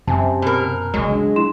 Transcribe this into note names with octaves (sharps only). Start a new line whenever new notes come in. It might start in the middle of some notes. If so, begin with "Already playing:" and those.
F#2 C3 G#5 A5
B2 A#4
D2 C#3 F#3 G#3
D4
E4 C6 E7